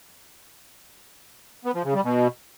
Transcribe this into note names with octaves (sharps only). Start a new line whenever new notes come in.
B3
F3
C#3
G3
B2